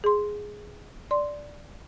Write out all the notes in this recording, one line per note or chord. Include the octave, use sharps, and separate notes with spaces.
G#4 C6
D5 C6